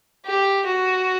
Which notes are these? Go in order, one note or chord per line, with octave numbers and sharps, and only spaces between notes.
G4
F#4